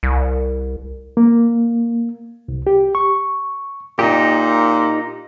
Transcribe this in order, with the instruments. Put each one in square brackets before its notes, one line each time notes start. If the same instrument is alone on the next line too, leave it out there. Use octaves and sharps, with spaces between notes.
[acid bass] C2
[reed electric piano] A#3
C2
G4
C#6
[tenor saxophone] A#2 [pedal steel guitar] D#4 G4